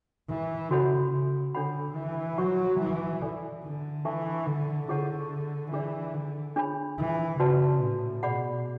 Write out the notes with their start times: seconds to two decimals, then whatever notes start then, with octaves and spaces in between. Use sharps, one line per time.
0.29 E3
0.70 C#3 F#4 A4 C#5 F#5 B5
1.12 C#3
1.55 D3 D4 A4 C#5 F#5 B5
1.96 E3
2.38 F#3 F#4 C#5 F#5 C#6
2.80 E3
3.22 A4 D5 G#5
3.64 D3
4.05 E3 D4 A4 E5 A5 C#6
4.46 D3
4.88 D3 E4 G#4 C#5 F#5 C#6
5.72 E3 D4 G#4 D5
6.14 D3
6.56 D4 G#4 C#5 G#5 B5
6.98 E3
7.40 C#3 F#4 B4 D5 F#5 A5
7.82 A2
8.23 B2 G#4 D5 F#5 B5